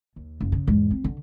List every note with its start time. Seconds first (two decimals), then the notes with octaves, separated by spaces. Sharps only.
0.16 D#2
0.41 F#1
0.52 C#3
0.67 E2 G#2
0.91 C4
1.04 D3